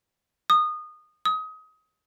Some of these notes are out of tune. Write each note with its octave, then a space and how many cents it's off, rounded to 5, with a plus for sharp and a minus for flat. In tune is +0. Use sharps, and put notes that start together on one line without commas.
D#6 -25
D#6 +25